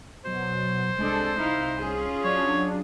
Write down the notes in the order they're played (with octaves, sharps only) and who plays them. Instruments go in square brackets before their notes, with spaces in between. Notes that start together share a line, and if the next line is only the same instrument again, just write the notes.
[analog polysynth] B2 F#3 [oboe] C5
[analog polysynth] C2 [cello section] G#3 D4 A4
[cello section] D#4 E4 F5
C#4 F4 G#4
[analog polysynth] F#3 D4 [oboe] C#5